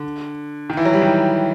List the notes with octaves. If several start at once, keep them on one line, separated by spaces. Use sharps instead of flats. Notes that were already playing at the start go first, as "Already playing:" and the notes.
Already playing: D3
D#3
E3
F#3
G3
D#3